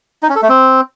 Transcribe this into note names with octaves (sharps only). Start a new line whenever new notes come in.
D#4
C#4
A4
A3
C4